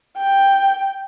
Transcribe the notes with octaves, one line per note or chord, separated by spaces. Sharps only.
G5